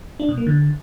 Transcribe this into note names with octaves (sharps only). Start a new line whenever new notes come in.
D4
B2
A#3
D3